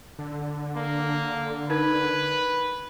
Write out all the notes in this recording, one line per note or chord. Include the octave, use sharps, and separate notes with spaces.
D3
A#3
D#4 A#4 B4 G#6